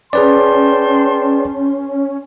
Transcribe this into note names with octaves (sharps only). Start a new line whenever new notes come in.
C#4 G#4 B4 D5 G5 A5 C6